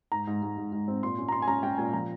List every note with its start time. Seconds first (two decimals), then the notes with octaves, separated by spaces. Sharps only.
0.12 G#2 A#5
0.27 G#2
0.42 G#2
0.57 G#2
0.72 G#2
0.88 C4
1.03 A#2 C6
1.18 C#4
1.28 A#5
1.32 C#4 C6
1.42 G#5
1.47 C#4 A#5
1.63 C#4 G5
1.78 A#2 G#5
1.93 F3 A#5